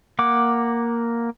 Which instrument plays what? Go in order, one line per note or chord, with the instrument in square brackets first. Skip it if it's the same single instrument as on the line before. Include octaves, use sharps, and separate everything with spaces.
[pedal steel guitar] A#3 F#5 D6